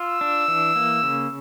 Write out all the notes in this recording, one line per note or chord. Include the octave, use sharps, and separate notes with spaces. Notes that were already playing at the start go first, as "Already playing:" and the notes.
Already playing: F4 E6
D4
E3
A#3
C#3